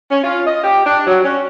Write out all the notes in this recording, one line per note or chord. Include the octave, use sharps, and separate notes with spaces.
C#4
F4
D#5
G4
D4
F#3
C#4